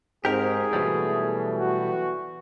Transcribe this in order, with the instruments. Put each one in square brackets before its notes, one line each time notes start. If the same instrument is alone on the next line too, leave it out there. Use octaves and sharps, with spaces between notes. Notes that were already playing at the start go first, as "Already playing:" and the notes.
[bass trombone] G#2 [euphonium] C4 [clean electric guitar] G4 A#4 [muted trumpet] G#4
[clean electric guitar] B2 F#3 G3 [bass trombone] E3 [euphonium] A3
[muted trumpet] F#4